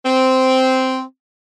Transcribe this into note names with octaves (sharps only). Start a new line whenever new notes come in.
C4